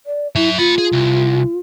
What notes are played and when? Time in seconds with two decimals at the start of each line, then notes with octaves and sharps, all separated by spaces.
0.06 D5
0.36 F#3 E4 E5
0.58 A#3 F4 B5
0.78 G#4
0.93 C2